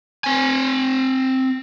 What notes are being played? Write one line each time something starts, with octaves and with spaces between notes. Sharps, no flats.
C4 G#5